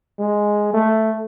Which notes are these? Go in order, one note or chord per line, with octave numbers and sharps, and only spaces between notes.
G#3
A3